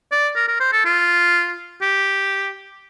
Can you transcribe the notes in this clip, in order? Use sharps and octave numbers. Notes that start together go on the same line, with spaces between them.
D5
A#4
A#4
C5
A4
F4
G4